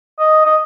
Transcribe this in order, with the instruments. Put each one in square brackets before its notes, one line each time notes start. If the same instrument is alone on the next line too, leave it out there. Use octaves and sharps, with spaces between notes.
[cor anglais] D#5
D#5